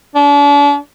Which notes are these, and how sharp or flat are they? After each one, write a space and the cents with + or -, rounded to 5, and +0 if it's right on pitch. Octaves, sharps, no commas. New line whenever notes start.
D4 -40